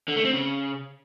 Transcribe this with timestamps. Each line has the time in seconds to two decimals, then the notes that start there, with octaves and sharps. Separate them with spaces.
0.08 D3
0.16 A3
0.25 C4
0.33 C#3